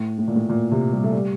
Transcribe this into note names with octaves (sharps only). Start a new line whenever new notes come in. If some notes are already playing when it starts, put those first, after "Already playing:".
Already playing: A2
A2
A#2
A2
A#2
C3
G3
A3
G3